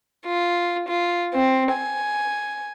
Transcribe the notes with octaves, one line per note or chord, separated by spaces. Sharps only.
F4
F4
C4
G#5